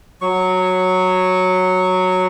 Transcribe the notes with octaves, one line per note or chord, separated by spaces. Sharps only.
F#3 C#6